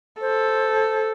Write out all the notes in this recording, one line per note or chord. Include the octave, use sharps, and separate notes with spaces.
A4 C5